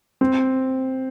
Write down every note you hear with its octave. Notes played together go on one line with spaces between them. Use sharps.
C4